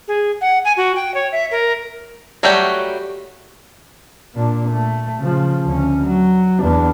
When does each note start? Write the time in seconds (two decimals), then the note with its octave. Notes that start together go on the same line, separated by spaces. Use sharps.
0.08 G#4
0.41 F#5
0.65 G#5
0.77 F#4
0.96 G5
1.14 C#5
1.32 E5
1.51 A#4
2.43 F#3 G3 A3 F#4 G4
4.35 A#2 D4
4.70 A3
5.20 C#3 F3
5.66 D2 C#4
6.06 F#3
6.62 E2 D4